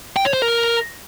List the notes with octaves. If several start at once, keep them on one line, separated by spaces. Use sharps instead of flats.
G5
C#5
C5
A#4